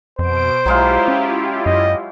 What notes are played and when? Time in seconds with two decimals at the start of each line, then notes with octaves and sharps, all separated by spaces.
0.19 F2 B2 C5 D7
0.66 B1 F#3 G#3 E4 F4 G4 F5
1.08 C#4
1.66 F#2 D#5